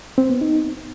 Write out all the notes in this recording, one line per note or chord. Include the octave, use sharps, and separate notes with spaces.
C4
B3
D#4